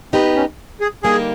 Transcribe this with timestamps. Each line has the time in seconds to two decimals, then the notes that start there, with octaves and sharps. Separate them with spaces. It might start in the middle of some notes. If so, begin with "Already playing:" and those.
0.13 B3 C4 D#4 G4 B4
0.36 C#4
0.81 G#4
1.03 D3 G3 A#3 D#4 G4 G#4